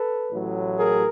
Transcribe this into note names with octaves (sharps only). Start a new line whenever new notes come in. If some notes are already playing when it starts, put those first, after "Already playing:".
Already playing: A4 B4
A1 A2 F#3
G#4 A#4